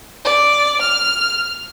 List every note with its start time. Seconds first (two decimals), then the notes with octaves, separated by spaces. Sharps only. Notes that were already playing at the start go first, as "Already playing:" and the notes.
0.25 D5
0.82 F6